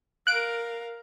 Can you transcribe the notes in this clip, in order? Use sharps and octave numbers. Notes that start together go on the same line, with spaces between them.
A#4 F5 F#6 D7